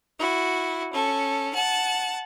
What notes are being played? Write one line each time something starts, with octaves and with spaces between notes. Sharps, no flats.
E4 F#4
C#4 A4
F#5 A5